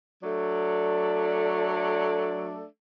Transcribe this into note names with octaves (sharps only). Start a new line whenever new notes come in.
F#3 A3 D4 A4 D5